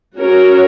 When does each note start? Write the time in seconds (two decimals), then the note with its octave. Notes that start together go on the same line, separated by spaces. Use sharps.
0.18 C#4 F#4 A#4 C#5